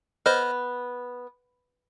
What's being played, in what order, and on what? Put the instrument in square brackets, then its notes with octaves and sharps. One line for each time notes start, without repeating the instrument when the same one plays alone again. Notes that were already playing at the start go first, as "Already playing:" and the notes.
[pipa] B3 [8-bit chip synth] C5 D#5 F6